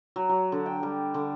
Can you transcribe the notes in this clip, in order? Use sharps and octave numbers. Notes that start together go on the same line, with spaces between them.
F#3
F#3
D3
G5
G3
D3